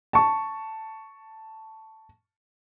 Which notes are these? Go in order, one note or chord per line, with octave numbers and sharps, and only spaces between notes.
A5 C#6